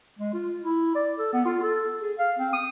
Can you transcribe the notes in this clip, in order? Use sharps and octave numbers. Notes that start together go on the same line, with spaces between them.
G#3
F4
E4
D5
A4
B3
F4
A4
G#4
F5
C4
D#6